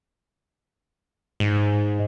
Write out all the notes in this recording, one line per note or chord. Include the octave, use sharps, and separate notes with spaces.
G#2